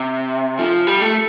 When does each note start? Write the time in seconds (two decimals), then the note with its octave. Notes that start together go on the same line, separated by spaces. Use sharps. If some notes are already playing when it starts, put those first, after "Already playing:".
Already playing: C3
0.59 F3
0.87 G3
1.02 A3